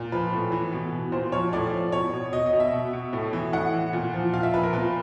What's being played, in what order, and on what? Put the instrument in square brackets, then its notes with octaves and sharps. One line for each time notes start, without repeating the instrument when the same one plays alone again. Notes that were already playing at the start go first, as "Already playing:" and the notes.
Already playing: [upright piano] A#2
F3 B4
A2
E3
B2
B2
A#2 C5
F3 C#5
A2 D5
F3
B2 C#5
B2
B2 D#5
D#5
B2
E5
B2
B2
A2
E3
A2 F#5
E3
A#2
F3
A#2 F5
E5
F3 B4
A#4
A#2 B4